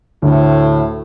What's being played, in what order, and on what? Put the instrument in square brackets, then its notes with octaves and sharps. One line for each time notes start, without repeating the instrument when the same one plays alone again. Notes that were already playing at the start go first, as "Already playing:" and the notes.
[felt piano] D2 [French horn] A2